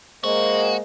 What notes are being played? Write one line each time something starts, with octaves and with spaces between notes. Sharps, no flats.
G#3 A#3 F#4 C5 D#5